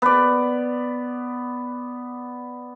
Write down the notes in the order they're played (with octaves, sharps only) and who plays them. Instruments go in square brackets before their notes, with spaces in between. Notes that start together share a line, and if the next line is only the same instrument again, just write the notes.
[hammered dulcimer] B3 D5